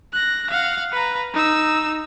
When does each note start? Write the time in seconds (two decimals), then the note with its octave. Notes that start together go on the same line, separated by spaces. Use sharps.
0.13 F#6 A#6
0.50 F5 F#5
0.92 B4 A#5
1.33 D#4 E6